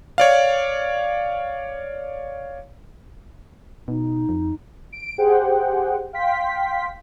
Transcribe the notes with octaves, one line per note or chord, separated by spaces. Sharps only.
C#5 D5 F5
B2 D#4
F2
D7
G4 G#4 C5 F#5 G5
F5 G5 C6 B6